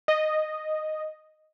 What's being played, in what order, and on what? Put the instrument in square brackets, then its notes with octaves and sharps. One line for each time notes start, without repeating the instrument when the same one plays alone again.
[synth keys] D#5